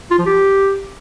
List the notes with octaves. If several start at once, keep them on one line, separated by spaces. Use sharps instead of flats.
F4
F3
G4